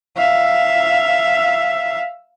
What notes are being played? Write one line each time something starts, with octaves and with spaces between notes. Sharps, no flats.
E5 F5